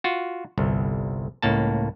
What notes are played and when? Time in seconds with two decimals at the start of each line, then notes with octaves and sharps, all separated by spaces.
0.04 F4 F#4
0.58 G1 C2
1.42 C#2 A2 A#3 A5